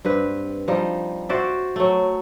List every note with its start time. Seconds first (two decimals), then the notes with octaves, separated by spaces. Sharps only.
0.05 G2 C4 B4
0.68 F3 G3 D#4
1.29 F#4 C5 D5 E5
1.76 F#3 A3